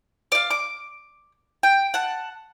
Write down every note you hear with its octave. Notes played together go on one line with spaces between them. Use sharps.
D5 F5
D6
G5
F#5 A5